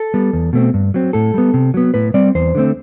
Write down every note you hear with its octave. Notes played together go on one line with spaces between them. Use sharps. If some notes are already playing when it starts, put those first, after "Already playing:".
Already playing: A4
G3 B3
E2
B2 A3 C4
G2
F#3 C4
A2 A4
G3 B3
C3
F#3 B3
A2 B4
G3 C4 D5
E2 C5
D3 A3 C4